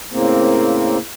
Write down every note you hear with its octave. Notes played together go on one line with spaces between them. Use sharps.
A2 C#3 A#3 C4